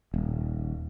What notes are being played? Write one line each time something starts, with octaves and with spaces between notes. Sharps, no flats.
D#1